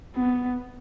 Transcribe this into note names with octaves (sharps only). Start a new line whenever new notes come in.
B3